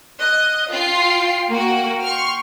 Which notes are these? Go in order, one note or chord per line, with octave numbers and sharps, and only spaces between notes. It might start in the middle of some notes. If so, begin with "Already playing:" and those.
D#5 F#6
F4 G5 C7
A#3 F#4 G5
C6 C#6 F6